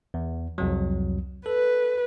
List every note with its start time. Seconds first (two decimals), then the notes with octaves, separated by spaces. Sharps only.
0.14 E2
0.58 C2 F2 F#3
1.46 A4 B4